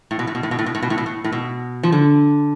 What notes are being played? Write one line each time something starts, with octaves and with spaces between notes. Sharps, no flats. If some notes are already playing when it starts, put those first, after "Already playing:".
A2
B2
A2
B2
A2
B2
A2
B2
A2
B2
A2
B2
A2
A2
B2
F3
D3